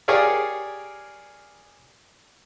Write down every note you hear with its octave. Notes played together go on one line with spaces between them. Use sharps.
G4 G#4 A#4 C#5 D5 F5